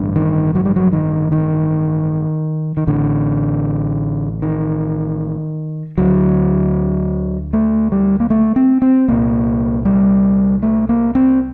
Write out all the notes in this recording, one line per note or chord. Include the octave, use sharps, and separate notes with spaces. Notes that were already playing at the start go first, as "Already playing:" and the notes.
Already playing: A1 G2 D3
D#3
F#3
G3
F#3
D#3
D#3
D#3
A1 A2 D3
D#3
D2 D3 F#3
A3
G3
A#3
A3
C4
C4
C2 A#2 A#3
G3
A3
A#3
C4